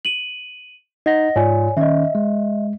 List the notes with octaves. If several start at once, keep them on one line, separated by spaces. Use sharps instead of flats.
D#7 F#7
D#4 D#5 F#5 A#6
G#2 F4 C#5 D5 G#5
D#3 C#4 D#5 E5
G#3